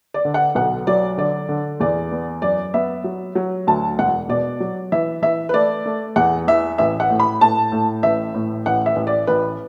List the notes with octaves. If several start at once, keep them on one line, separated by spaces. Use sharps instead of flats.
D5
D3
F#5
B1 F#5
F#3 D5
D3 D5
D3
E2 D5
B3
F#2 D5
B3 E5
F#3
F#3
D2 A5
E1 F#5
B2 D5
F#3
E3 E5
E3 E5
B4
A3 D5
A3
E2 F#5
E3 E5
A1 E5
F#5
A2
B5
A2 A5
A2
A1 E5
A2
A1 F#5
E5
A1
D5
A1 B4